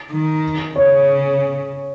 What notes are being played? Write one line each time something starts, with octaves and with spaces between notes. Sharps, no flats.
D#3
C#3 C#5